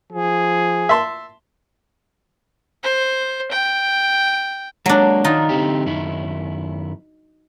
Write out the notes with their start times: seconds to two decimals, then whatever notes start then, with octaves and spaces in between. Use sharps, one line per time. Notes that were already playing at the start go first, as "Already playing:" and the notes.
0.12 F3 G#4
0.89 E5 A5 C6
2.84 C5
3.51 G5
4.86 F#3 G#3 A#3 D4
5.24 D#3 D4 D#4 F4
5.49 D3 C4 G4
5.86 F#2 D#3 E4